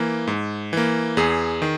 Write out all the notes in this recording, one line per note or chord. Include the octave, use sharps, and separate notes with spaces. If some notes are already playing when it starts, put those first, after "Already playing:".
Already playing: E3 A#3
G#2
E3 A#3
E2 G#4
D#3